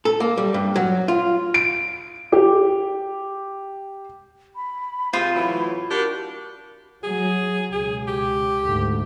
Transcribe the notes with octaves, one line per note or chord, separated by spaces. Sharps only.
A4
A#3
G3
G2
F#3
F4
D7
G4
B5
C3 F4 G#4 C5
A2 E3 F#3
D4 F#4 G4 A#4
F#3 G#4
C#2 B2 G#4
G4
D2 G#2